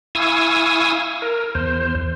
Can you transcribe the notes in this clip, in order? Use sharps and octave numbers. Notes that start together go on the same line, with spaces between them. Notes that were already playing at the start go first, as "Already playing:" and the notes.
E4 F5 G#5 C#6 D#6 E6
A#4
E2 C5